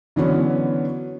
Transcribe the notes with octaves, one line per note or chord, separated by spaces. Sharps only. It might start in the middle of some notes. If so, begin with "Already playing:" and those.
D3 E3 F#3 B3 C#4